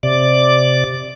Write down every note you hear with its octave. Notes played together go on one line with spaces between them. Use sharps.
C3 D5 D6